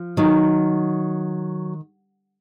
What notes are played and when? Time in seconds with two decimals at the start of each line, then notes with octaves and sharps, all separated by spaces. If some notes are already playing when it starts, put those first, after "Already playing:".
Already playing: F3
0.17 D#3 F#3